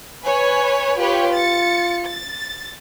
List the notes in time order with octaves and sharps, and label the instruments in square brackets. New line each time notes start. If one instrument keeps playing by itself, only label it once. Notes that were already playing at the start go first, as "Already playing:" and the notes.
[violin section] B4 C#5 G#5
[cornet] F4 [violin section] G4 B4 C#5
[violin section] A6 C#7
A6